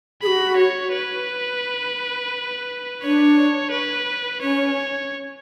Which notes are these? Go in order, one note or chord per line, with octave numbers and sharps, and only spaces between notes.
F#4 G#4 B5
C#5
B4
D4 C#5
B4
C#4 C#5